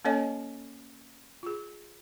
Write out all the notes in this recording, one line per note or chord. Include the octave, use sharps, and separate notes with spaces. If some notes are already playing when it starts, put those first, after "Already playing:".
A#3 C#4 A4 C#5 D#5 G#5
F4 G#4